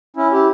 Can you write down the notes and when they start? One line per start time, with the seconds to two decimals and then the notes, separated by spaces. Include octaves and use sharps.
0.17 C#4 E4
0.32 E4 G4